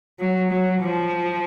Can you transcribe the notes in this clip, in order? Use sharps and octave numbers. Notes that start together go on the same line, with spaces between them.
F#3
F#3
F3